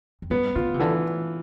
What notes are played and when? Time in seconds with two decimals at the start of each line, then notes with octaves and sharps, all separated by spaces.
0.22 F2
0.30 G2 B3
0.55 D3 F4
0.74 C3
0.80 D3 E3